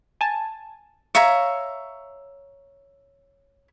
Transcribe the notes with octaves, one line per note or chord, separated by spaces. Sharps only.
G#5 A5
C#5 E5 F5 A#5